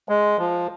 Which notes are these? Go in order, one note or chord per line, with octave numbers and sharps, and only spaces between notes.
G#3
F3